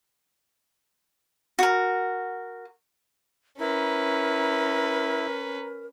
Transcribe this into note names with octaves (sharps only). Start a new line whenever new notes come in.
F#4 A#4
C#4 E4 A#4 B4 A#5